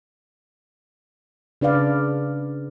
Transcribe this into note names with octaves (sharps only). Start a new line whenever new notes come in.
C#3 D4 B4 D5 F5